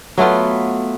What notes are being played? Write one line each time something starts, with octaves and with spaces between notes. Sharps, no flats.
F#3 A3 B3 F4